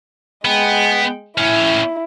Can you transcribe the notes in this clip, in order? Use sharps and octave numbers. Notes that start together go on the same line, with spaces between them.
G#3 B3 G5
A2 C#4 E4